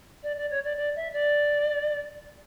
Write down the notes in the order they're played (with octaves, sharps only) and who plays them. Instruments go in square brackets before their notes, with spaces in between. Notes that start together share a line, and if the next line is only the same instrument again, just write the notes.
[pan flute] D5
D5
C#5
D5
D5
E5
D5